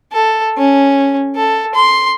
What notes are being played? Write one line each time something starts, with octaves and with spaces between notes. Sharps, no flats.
A4
C#4
A4
C6